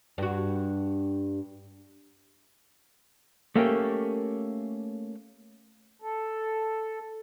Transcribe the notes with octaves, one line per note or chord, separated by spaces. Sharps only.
G2 F#4
A3 A#3 C#4 G4
A4